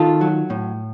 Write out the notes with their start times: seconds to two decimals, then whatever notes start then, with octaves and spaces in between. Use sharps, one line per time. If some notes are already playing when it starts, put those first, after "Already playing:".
Already playing: D#3 F4 A4
0.21 F#3
0.50 A2